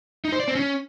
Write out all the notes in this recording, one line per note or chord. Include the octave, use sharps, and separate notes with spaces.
D#4
C5
D5
C4
C#4